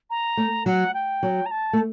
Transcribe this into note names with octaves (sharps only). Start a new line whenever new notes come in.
A#5
A3
F#3 F#5
G5
F#3
A#5
A5
A3